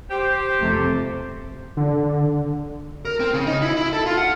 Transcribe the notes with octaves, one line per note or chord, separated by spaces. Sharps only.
G4 C5
F2 C3 A3
D3
A#4
C4
C#3
D#4
E4
E4
A4
F4
F#5